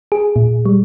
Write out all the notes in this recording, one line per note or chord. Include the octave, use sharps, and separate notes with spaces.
G#4
A#2
G3